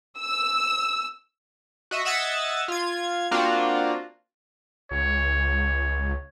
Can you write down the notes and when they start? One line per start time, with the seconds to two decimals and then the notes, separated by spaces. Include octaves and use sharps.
0.18 E6
1.91 F#4 D#5 E5
2.05 D#5 E5 F#5 E6 G#6 A6
2.68 F4 G#6
3.31 A#3 C4 D4 F4 F#4
4.91 C#2 C#5